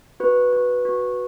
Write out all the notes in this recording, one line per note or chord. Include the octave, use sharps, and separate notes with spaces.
F#4 B4
F#4
F#4